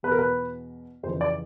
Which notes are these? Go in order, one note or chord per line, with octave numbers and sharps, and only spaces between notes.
E2 B2 B4
A#4
B4
F2 C#3 E3 C5
D5